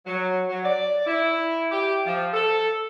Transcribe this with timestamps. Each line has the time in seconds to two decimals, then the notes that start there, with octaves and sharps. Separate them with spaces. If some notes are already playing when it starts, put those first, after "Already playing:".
0.06 F#3
0.49 F#3
0.64 D5
1.06 E4
1.71 G4
2.06 F3
2.34 A4